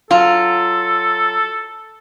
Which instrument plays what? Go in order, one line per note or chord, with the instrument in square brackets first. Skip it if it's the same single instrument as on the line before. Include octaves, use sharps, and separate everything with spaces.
[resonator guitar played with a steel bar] F#3 F4 [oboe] A4